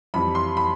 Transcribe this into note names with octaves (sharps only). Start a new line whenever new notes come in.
F2 E3 G3 B5
C6
B5